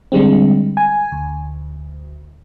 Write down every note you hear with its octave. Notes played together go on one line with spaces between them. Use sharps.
D3 G3 G#3 C4
G#5
D2